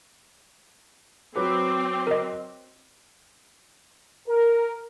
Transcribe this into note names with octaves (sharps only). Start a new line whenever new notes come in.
F#3 C4 B4 D6
A#4 D#5
A#4